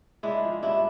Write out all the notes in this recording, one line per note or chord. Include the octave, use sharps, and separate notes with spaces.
G#3 D4 E4
F3
G2 D4 E4